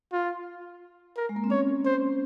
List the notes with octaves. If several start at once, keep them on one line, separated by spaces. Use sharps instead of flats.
F4
A#4
G#3
A#3
C4
C#4 C#5
C5